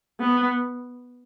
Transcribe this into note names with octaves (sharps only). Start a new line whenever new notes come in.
B3